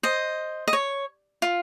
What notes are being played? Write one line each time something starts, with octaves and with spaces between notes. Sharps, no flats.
C5 D#5
D#5
C#5
F4